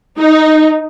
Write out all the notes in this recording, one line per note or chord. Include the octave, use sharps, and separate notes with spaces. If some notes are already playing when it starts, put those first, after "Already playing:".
D#4